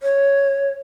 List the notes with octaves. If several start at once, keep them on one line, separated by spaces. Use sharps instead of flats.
C#5